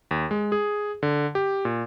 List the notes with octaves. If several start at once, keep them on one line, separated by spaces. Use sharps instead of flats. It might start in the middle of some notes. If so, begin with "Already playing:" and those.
D#2
G#3
G#4
D3
G4
A#2